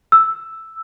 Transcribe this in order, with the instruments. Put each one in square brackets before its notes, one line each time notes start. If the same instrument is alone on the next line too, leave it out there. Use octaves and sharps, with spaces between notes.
[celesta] E6